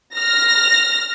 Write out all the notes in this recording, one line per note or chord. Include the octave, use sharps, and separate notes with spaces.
F6 A#6